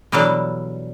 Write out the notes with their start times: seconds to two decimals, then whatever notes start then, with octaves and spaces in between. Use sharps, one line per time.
0.12 B2 E3 F#3 G3 D4 A4